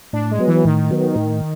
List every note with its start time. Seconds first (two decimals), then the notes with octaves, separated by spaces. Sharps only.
0.13 A2 D4
0.31 G#3
0.39 F#3 B3
0.47 E3
0.65 A2 D#3
0.91 F#3 B3
1.16 A2